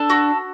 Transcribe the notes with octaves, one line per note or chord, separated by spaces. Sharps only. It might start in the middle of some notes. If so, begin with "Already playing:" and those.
Already playing: D4 A4
F#4